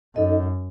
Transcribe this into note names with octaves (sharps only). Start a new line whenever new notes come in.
F#2 D#4 A4 D#5